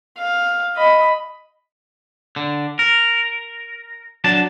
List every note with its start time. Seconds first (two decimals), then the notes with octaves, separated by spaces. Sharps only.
0.18 F5
0.76 D#5 B5
2.36 D3
2.79 A#4
4.24 F#3 D4 A5